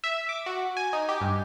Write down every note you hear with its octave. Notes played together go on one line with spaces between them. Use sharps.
E5
D6
F#4
G#5
D#4
G4
G2